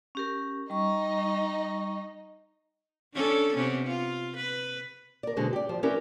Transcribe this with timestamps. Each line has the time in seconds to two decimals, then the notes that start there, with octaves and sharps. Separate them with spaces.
0.15 C#4 G4 A#4
0.70 G3 D#4 D#5 C#6
3.15 C#4 D4 A4
3.55 C3 B3 C#4
3.87 F4
4.36 B4
5.23 A#4 D5
5.36 B2 D3 G#3 F#4 G#4 C5
5.53 G4 D5
5.69 F3 C5
5.83 C#4 E4 G4 A#4 B4 D5